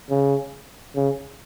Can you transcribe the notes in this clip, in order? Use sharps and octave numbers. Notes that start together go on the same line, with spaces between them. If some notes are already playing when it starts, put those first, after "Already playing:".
C#3
C#3